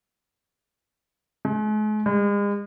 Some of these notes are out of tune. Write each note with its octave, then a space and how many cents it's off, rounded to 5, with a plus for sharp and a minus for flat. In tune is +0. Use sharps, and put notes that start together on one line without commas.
G#3 +45
G#3 -40